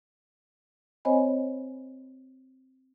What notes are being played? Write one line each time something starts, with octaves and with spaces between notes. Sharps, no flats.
C4 C5 C#5 D#5 G#5 B5